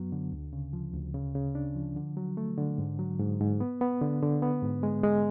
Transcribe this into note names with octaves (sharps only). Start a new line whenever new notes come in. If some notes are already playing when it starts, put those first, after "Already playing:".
Already playing: F#2 F#3 B3
D3
D2
C#3
F3
D2
C#3
C#3
D4
F3
D3
F#3
A3
D3
G#2
F#3
G#2
G#2
B3
B3
D3
D3
B3
G#2
G#3
G#3